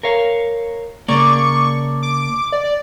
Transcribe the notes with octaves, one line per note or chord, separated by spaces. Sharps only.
A#4 C#5 F5
C#3 A#3 D4 D5 C#6
D6
D5